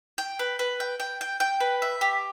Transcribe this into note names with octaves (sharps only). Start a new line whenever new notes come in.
G5
B4
B4
G5
G5
G5
G5
B4
E5
G4